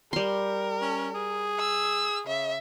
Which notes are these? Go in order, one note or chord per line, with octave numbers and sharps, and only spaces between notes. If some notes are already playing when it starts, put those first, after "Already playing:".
G3 A#4 C6
C#4
G#4
E6
C#3 E5